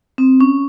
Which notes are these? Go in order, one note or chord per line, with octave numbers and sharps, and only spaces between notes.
C4
C#4